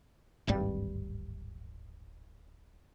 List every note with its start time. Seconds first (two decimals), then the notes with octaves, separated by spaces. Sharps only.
0.47 D1 G#1 G2 G3